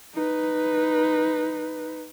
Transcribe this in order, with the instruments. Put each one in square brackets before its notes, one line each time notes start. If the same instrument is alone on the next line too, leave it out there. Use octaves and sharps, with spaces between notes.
[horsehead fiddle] D#4 B4